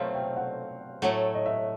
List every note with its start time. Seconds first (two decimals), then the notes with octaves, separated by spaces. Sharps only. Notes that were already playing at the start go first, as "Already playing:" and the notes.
Already playing: B2 F#3 A3 C4 F4 C5 F5
0.14 G5
0.37 F#5
1.02 A2 F#3 A3 F#5
1.35 D#5
1.46 E5